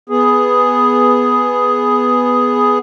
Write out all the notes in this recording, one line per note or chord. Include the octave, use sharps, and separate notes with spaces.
B3 G#4